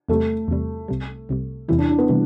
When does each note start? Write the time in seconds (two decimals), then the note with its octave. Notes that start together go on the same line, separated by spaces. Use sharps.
0.09 E2 C3 G3 A3
0.48 E2 C3 G3
0.88 C2 C3 G3
1.29 C2 C3 G3
1.68 E2 C3 E3 G3 E4
1.78 D4
1.89 D4
1.98 B3
2.08 C3 E3 G3